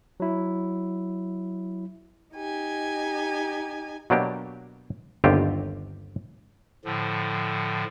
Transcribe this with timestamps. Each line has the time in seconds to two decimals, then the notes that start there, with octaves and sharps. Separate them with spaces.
0.20 F#3 E4
2.35 D#4 G4 G#5
4.10 B2 F#3 A#3 D4 G4
5.24 G1 D#2 D3 C4 F4 G4
6.85 A2 D3 F3